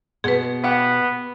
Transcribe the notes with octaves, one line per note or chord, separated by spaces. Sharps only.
B2 G#4 B4
B3 G4 F#5